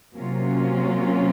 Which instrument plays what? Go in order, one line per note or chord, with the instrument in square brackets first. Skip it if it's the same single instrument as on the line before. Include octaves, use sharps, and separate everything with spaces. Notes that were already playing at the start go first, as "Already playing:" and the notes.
[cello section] C3 F#3 A#3 C#4 F4